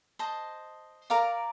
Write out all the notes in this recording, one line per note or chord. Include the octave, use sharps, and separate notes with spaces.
C5 D#5 A5
A#4 D5 F5 A#5